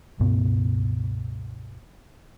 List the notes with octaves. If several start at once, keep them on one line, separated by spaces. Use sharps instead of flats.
C#2 G2 B2 B3